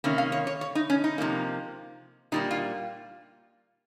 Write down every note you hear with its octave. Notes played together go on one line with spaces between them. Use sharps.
C3 D#3 A#3 C#4
F5
C#5
C#5
C#5
D#4
C#4
D#4
C3 F3 A#3
A#2 G3 A#3 D#4
F4